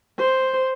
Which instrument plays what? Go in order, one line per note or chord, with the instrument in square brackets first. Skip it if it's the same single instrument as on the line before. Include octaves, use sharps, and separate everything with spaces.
[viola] C5